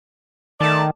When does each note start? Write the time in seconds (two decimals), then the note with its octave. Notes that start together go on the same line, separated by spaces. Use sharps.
0.61 D#3 A3 D5 A5